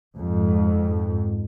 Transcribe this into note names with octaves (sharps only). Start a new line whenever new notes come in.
F2 G#2